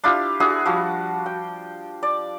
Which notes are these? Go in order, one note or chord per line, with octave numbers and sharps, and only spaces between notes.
D4 E4 F4 G4
D4 E4 F#4 G#4
F3 G3 F#4
G5
D5